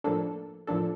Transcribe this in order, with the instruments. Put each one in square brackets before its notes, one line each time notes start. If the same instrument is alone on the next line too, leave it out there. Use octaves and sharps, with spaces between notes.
[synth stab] A2 F3 A#3 D4 A4
A2 F3 A#3 D4 A4